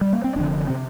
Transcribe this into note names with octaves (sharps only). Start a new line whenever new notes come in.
G3
A#3
C4
F1 F2 D3 D4
C3 C4